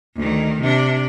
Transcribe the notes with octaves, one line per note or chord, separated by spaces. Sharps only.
D2 D#3
C3 D4